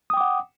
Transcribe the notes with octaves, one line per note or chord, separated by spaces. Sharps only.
F#5 G5 D6 D#6